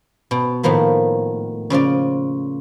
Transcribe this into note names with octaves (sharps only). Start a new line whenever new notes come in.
B2
A2 D#3 F3 A#3 B3
C#3 F3 F4 D5